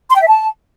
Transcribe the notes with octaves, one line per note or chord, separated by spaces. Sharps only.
C6
G5
E5
A5